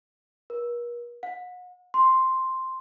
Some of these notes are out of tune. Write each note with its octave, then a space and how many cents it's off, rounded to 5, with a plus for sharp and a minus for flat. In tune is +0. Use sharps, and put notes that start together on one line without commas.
A#4 +45
F#5 -40
C6 +0